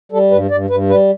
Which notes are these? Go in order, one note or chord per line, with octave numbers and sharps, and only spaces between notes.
G3 A4
G2 B4
G2 D5
G2 B4
G3 B4